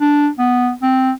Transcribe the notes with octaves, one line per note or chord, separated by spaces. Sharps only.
D4
B3
C4